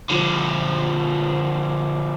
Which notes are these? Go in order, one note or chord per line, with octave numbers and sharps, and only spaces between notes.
D3 F3